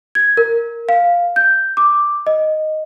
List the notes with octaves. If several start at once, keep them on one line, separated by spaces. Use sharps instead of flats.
G#6
A#4
F5
G6
D6
D#5